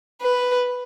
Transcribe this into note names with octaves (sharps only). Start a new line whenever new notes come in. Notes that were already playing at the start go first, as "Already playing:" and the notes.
B4